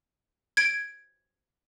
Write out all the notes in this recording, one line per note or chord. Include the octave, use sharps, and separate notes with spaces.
G#6 D7